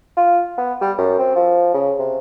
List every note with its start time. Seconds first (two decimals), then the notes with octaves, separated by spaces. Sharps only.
0.17 F4
0.58 B3
0.81 G3
0.98 F#2
1.18 C4
1.35 F3
1.74 C#3
1.99 C3